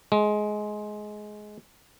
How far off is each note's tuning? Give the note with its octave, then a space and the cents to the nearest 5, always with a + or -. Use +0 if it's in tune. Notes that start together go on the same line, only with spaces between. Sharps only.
G#3 +15